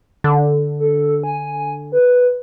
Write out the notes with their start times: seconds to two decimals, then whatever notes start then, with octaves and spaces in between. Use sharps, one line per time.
0.24 D3
0.80 A4
1.24 G#5
1.92 B4